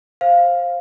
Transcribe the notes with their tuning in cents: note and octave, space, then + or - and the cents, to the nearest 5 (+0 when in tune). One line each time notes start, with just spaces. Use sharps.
C5 +10 F5 +0